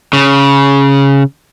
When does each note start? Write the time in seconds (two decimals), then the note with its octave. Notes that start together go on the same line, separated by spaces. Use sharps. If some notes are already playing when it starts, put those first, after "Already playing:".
0.13 C#3